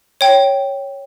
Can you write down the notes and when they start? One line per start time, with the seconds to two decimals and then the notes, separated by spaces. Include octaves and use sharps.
0.21 C#5 G5